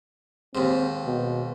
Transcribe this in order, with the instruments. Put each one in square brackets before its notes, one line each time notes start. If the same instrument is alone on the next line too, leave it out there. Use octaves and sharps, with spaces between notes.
[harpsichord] D#2 G#2 [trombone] C4
[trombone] B2